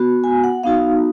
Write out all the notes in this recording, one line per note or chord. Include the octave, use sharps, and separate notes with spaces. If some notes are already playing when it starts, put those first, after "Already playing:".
Already playing: B3 F#4
G#5
F#5
B3 D#4 F#4 F5